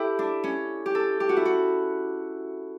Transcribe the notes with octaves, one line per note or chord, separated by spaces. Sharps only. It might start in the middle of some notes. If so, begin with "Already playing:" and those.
Already playing: E4 G4 A4
D4
C#4
G4
A4
G4
F#4
E4
F#4